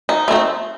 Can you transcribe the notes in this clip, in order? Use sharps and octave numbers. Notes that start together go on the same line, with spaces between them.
D#4
A3 C4 D#4